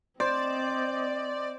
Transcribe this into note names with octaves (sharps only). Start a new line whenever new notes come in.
C4 C5 D5 D#5